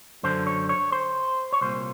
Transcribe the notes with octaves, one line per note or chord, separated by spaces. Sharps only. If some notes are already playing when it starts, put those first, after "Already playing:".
F#2 D3 C5
C#5
C#5
C5
C#5
C2 A#2 C5